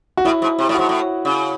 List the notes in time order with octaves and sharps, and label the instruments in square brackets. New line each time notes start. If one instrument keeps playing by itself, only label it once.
[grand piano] F#4
[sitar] A2 [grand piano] E4
[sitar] G#2
C3
A2
[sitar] G#2 [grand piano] F#4
[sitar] A2
C#3